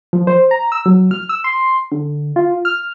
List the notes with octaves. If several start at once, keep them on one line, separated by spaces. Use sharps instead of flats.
F3
C5
A#5
E6
F#3
F6
E6
C6
D3
F4
F6